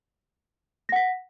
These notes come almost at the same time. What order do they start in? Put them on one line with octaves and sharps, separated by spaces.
A#6 F#5 B6